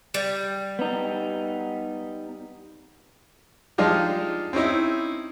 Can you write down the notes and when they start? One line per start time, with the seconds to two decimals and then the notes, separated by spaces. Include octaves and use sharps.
0.14 G3
0.79 B3 D#4
3.78 F3 G#3 D4 D#4 F4 G4
4.53 C4 C#4 D#4 E4